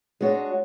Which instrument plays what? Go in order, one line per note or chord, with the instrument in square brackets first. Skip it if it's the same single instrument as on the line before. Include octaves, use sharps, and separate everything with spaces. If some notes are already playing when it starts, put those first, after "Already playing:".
[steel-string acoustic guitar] G#3 D4 F#4 C#5